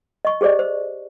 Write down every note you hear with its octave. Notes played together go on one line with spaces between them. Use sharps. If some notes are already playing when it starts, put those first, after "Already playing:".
D#5 C#6
G4 G#4 C5 D5 D#5
C5